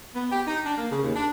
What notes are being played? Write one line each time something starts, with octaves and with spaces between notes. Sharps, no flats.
B3
G4
D#4
D4
A#3
C#3
D#2
D4